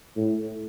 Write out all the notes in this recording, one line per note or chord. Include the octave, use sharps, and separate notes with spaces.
A2